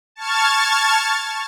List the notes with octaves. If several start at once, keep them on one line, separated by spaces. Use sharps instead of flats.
A5 C#6 F6 G#6 A6